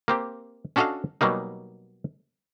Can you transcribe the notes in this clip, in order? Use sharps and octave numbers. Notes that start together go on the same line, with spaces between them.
A#3 C4 G4
C#4 D4 F#4 A4 D#5 F5
B2 F#3 G3 A#3 D#4